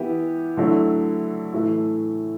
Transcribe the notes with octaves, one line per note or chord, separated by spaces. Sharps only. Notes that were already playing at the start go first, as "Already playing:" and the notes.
Already playing: E3 B3 E4 G4
D3 F#3 A3 E4
A2 E3 A3 E4